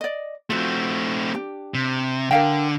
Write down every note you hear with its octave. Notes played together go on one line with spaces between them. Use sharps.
D5 D#5
A3 C4 F4 F#4
D4 G4
C3
D3 A#4 F5 G5